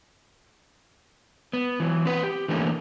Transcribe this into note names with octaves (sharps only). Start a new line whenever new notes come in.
B3
E3 F#3
C4 B4
G4
D3 E3 A3 A#3 C#4